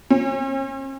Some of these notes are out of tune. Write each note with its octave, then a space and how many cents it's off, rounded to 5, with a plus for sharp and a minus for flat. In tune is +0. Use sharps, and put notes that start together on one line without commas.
C#4 -45